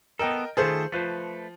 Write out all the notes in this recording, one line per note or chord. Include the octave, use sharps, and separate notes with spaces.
B3 A4 A#4 D#5 G5
D#3 A3 F4 G#4 A4 C5
F3 A3 B4 C5